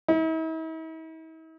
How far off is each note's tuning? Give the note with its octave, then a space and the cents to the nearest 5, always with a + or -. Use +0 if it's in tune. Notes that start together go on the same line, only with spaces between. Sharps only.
E4 -45